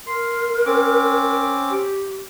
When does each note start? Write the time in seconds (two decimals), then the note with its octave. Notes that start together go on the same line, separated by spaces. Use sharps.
0.07 A#4 C6
0.66 C4 C#4 D6
1.70 G4